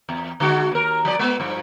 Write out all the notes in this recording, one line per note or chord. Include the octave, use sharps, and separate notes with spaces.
E2
D3 G#3 F#4
D#2 A#4
F3 D5
G#3 B3
G2 F3